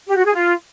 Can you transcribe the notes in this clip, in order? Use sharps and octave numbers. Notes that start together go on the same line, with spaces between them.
G4
F#4
G#4
F4